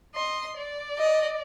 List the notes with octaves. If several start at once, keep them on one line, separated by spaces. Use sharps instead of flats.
D#5 C6
D5
D#5